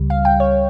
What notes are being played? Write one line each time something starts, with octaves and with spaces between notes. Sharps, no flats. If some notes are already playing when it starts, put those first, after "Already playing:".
Already playing: C#2 C#3 G3
F5
G5
C#5